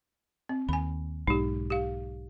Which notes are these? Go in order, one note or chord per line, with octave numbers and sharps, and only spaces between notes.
C4
D#2 G#5 B5
B1 G#2 D#4 G4
G4 F5